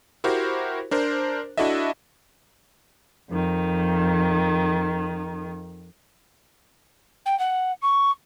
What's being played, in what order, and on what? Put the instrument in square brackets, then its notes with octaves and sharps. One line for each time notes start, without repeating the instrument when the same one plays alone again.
[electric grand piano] E4 F#4 G4 A#4 C5
D4 A#4 C5
D4 E4 F#4 A4 D#5 E5
[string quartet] F2 D#3
[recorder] G5
F#5
C#6